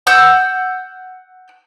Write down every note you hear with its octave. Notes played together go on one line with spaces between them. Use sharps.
F#5 E6 G6